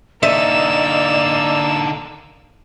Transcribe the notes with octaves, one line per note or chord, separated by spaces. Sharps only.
D3 A#3 D#4 D5 E5 E6